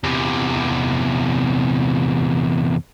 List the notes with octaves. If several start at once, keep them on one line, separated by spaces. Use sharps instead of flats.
E2 C3